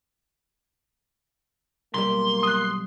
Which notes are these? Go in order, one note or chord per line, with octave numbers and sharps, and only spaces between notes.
B1 G3 A#3 C6
D#6 F#6